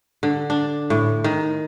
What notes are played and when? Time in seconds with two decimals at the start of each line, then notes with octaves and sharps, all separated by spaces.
0.23 D3
0.50 D4
0.90 A2
1.24 D#3